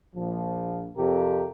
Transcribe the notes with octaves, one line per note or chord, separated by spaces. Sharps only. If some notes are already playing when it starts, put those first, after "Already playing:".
A#1 F3
F2 C3 G4 A#4